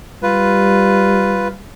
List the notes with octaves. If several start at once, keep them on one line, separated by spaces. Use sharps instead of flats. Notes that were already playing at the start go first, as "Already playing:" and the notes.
G3 F4 B4